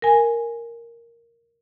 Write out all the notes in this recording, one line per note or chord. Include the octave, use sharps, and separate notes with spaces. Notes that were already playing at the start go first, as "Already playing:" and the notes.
A#4 G#5